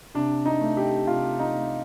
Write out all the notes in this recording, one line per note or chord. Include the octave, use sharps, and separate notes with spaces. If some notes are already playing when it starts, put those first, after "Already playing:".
C3 D4
D#4
A3
G4
C3 F4
D#4
A3